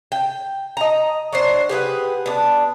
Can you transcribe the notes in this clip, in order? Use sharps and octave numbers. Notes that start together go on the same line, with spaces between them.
G5
D#5 A#5
F#3 D4 C5
G4 G#4 B4 F#5
B3 D4